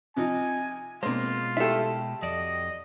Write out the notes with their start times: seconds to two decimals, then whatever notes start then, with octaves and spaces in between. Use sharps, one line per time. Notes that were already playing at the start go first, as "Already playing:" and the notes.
0.16 C3 F3 D#4 G#5
1.03 B2 G#3 A#3 C4 F4 C5
1.57 E4 G4 A4 E5
2.23 F2 F#4 D5 D#5